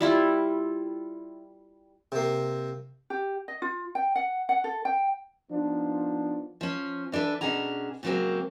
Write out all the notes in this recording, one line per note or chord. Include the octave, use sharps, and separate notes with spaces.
G3 E4 F4
C3 A#3
G4
D#5
F4
G5
F#5
F#5
A4
G5
F3 B3 D4 D#4 F4
F3 C#4
E3 D4 A4 B4
B2 C#4 D4 G#4 A#5
A#2 C#3 F#3 G#3 A#3 C4